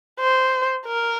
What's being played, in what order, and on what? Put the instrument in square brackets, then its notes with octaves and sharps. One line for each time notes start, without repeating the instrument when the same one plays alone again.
[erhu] C5
A#4